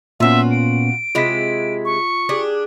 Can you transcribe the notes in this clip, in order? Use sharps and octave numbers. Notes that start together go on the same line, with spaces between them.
A#2 B3 C#4 F4 F#4 E5
D7
C3 G#3 E4 F4 B6
C#6
D4 G4 G#4